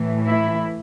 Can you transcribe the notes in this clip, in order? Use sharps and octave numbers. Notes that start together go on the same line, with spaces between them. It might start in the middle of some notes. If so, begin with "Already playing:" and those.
Already playing: A2 E3 A3
E4